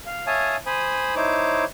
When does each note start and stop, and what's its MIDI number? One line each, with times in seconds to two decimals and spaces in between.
0.07 0.25 77
0.27 0.56 73
0.27 0.56 76
0.27 0.56 77
0.27 0.56 80
0.27 0.56 81
0.27 0.56 87
0.66 1.15 72
0.66 1.15 80
0.66 1.15 83
0.66 1.15 87
1.16 1.65 63
1.16 1.65 64
1.16 1.65 72
1.16 1.65 73
1.16 1.65 86